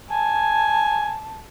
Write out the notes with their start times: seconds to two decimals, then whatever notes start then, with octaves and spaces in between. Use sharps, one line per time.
0.10 G#5 A5